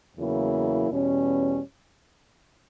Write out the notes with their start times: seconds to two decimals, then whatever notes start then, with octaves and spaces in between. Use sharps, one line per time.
0.17 E2 C#3 F#3 A#3 E4
0.88 E2 B2 G3 C#4